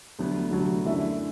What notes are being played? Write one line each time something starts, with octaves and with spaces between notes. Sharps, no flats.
D2 D3 F#3 B3
D2 D3 F#3 B3
F#2 D3 A3 E4